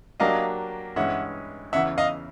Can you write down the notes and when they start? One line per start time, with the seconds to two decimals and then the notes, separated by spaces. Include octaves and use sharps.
0.20 F#3 A#3 D4 G4 D#5 F5
0.96 G2 E3 G#3 C#4 E5 F#5
1.72 E2 C#3 E3 E5 F#5
1.98 D#5 F5